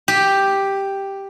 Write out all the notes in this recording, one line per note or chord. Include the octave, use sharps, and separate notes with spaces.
G4